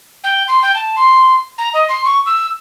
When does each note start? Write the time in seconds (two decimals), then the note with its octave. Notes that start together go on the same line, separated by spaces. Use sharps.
0.24 G5
0.48 C6
0.62 G5
0.75 A5
0.96 C6
1.58 A#5
1.74 D#5
1.89 C6
2.05 C#6
2.26 E6